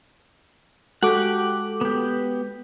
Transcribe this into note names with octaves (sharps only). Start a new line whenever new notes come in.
G#3 F#4 G4 A4 F#5 D6
B3 G4